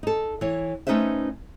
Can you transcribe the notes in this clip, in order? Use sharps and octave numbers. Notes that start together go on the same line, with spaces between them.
D#4 A4
E3 C#5
A3 C#4 D#4 B4 C5 E5